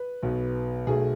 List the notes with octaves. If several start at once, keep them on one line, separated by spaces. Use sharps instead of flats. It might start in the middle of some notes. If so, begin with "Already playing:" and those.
Already playing: B4
B1 B2 B3
B1 B2 A3 G#4